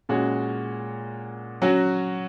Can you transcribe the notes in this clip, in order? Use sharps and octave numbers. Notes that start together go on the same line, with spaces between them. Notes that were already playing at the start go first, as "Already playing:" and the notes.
A#2 G#3 C#4 F#4
F#3 C#4 F#4